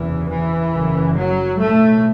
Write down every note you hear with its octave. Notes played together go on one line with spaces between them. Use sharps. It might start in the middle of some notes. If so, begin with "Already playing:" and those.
Already playing: F#1 E2 C3 E3
E3
F#1 F#2
F#3
B1 A2 A3